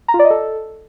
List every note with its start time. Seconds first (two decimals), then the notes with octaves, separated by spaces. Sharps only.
0.08 A#5
0.14 F4
0.19 D5
0.25 D#5
0.30 A4